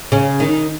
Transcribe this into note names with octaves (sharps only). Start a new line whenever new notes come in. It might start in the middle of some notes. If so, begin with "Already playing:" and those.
C#3 C#4
D#3 D#4